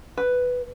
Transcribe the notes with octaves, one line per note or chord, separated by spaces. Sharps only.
B4